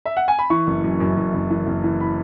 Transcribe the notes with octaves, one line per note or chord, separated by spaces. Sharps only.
E5
F#5
G#5
B5
E3 C#6
F#1
F#2
F#2
F#2
F#1
E3
F#1
E3
B5